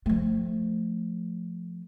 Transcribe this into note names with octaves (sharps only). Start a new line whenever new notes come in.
F3 A3